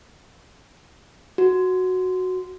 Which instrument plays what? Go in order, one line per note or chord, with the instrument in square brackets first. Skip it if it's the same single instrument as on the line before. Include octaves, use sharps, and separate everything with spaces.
[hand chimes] F#4